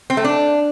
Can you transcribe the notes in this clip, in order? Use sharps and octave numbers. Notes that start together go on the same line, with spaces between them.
C4
A3
D4